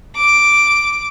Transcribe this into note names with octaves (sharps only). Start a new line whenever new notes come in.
D6